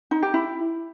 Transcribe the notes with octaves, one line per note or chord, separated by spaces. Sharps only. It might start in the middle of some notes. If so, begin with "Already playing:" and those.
D#4
G4
E4